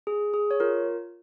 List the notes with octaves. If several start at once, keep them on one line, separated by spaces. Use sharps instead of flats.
G#4
G#4
C#5
F4 A#4